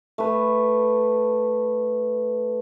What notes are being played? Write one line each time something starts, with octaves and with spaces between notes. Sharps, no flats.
A3 B4